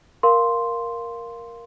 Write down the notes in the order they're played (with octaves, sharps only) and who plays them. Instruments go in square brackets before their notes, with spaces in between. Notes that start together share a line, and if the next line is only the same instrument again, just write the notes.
[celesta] A#4 F5 C6